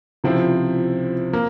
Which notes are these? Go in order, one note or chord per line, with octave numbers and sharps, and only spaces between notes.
C#2 C3 F3 C4 E4
A#3